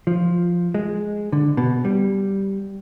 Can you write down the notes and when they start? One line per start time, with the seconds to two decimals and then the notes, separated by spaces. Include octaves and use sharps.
0.07 F3
0.74 G#3
1.33 D3
1.57 B2
1.85 G3